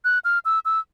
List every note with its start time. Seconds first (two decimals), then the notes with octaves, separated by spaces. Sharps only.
0.05 F#6
0.25 F6
0.45 E6
0.65 E6